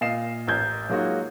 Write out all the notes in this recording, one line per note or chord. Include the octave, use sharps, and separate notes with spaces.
A#2 D#5 F5 C7 E7
A1 A#4 G6 G#6
F#3 G#3 A#3 D#4 F4 F#4